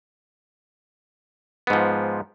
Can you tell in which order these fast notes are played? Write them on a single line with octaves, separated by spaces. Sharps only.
B3 G#2 F3